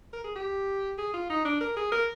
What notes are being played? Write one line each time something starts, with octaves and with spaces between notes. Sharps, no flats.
A#4
G#4
G4
G#4
F4
D#4
D4
A#4
G#4
A#4